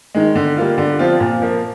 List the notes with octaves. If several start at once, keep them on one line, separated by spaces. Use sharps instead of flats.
D#3 G#3
D3
G3 A#3 F4
D3
F3 C4 F4
A#2
F3 A#3